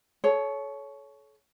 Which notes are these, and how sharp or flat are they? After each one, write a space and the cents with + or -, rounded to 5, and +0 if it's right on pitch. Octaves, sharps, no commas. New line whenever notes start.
A4 -35 C#5 +10